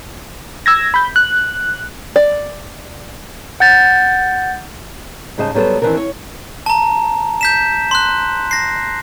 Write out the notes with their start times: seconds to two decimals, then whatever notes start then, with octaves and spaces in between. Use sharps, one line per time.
0.66 E6 G#6 A#6
0.94 B5 G6
1.16 F#6
2.16 D5
3.60 F#5 G6 A6
5.38 G#2 C#3 G3 C5 D#5 A5
5.54 F#3 G3 B3 A4 C5
5.82 D#3 E3 C4 D4 A#4
5.97 C#5
6.66 A5 A#5
7.41 G6 B6 E7
7.91 C6 F#6
8.51 A#6 C7